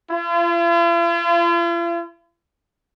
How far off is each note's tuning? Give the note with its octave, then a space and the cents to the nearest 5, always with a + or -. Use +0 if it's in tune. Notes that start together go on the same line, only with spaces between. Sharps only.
F4 -45